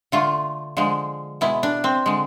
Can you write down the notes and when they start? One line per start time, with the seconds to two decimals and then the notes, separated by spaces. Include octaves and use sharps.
0.12 D3 A3 F4
0.77 D3 F3 G#3
1.41 B2 G#3 E4
1.63 D4
1.84 C4
2.06 D3 G#3